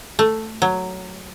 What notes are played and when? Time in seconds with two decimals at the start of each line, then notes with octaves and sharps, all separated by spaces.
0.19 A3
0.62 F#3